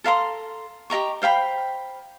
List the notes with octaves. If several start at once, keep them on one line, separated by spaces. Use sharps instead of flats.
A4 F5 A#5 C6
G4 D#5 A#5 C#6
C5 F5 G5 B5